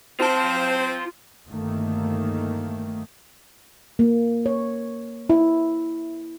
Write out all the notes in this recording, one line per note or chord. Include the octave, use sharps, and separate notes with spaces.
C4 F4 C5 A5
G1 D#3 A3 A#3
A#3
C#5
E4